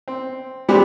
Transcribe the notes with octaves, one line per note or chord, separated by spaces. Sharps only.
C4
G3 G#3 B3 C4 D4 G4